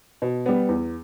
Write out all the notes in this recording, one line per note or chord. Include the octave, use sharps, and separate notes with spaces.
B2
G3 B3
E2